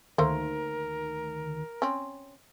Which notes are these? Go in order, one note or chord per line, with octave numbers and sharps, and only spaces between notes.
D2 D#3 A3 A#3 A#4 C5
C4 C#4